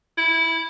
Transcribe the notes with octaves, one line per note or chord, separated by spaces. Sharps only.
E4